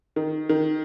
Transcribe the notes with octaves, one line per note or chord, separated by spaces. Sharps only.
D#3
D#3